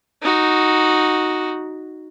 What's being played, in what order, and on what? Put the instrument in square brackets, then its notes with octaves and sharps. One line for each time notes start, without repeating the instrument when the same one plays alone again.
[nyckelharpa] D#4 F#4